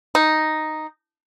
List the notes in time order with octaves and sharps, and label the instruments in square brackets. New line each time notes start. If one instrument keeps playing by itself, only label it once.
[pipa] D#4